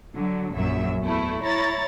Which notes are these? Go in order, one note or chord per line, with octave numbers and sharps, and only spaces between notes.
D3 F#3
A#1 F#2 F#3 E5
E2 A3 E4
E4 C#5 A#5 A6